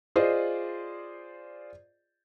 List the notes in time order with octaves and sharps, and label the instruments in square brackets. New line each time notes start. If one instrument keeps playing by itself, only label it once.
[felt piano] F4 G#4 C5 D5 D#5